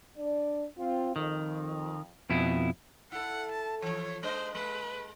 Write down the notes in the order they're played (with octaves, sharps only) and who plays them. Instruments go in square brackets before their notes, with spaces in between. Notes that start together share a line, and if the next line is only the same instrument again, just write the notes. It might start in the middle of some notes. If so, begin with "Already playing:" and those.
[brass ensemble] D4 D5
C4 F4
[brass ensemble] F2 [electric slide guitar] D#3
[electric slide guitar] F2 B2 E4
[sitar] E4 A4 [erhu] F#5
[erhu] A5
[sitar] E3 F3 [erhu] C#5
[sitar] G#3 D4 D#5 [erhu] C5
[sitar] G#3 [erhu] B4